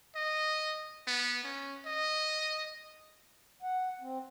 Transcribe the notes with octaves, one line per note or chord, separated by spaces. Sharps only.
D#5
B3
C#4
D#5
F#5
C4